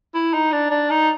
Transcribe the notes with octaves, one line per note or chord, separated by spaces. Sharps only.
E4
D#4
D4
D4
D#4